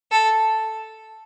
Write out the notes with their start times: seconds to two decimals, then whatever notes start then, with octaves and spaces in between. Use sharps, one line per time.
0.12 A4